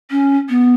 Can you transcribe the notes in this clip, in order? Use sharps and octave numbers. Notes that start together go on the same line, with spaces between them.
C#4
B3